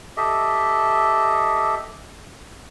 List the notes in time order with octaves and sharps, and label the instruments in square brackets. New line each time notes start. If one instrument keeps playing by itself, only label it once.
[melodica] G4 A4 D#5 E5